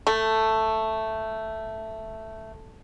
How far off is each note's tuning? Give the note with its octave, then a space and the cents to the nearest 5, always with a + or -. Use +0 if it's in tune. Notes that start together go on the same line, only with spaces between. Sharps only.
A3 +5